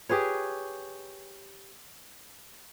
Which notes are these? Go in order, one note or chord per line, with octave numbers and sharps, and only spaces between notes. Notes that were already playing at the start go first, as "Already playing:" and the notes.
G4 G#4 B4 C#5